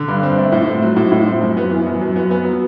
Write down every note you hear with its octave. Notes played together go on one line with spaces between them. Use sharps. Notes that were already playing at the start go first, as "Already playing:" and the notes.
Already playing: D3
G2
C4
A3
A2
C4
F#3
A2
A2
C4
F#2
B3
E3
F#2
F#2
B3
B3
F#3